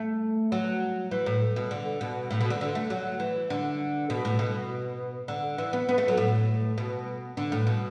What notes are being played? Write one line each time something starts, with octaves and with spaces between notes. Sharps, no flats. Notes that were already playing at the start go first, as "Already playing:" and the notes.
Already playing: A3
F#3
E3
A2
B2
D3
B2
A2
B2
D3
D3
A3
F#3
E3
D3
B2
A2
B2
D3
E3
B3
B3
A3
F#3
A2
B2
D3
A2
B2